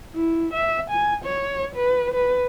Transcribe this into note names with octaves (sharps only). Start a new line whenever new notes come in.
E4
E5
G#5
C#5
B4
B4